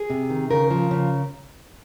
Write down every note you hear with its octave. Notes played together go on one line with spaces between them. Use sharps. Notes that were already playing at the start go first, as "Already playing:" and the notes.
Already playing: G#4
C3
D#3
C#3 A#4
F3
C#3